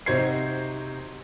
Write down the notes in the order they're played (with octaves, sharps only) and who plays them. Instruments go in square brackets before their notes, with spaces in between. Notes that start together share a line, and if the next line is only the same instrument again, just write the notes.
[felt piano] C3 D#4 F#4 C5 G#6 C7